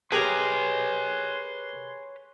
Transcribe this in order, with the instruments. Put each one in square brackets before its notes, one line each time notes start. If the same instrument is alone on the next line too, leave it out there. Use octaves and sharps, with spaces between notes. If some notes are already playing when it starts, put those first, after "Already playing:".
[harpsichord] G4 A#4 A#5 [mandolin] G#4 [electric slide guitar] B4 C#5 [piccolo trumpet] C6